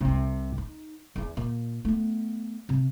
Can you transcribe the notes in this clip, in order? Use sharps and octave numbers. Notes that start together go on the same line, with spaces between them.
C2 C3
D#4
E2 E3
A#2
A3 B3
C3 F#3